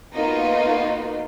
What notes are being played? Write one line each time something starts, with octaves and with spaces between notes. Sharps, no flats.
A#3 B3 D#4 F4 F#4